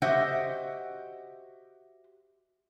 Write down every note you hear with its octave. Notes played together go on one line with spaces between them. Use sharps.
F#4 G4 C5 D#5 E5 F#5